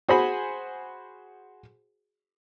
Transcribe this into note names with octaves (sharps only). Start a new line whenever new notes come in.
F#4 G#4 C5 F#5 G#5 B5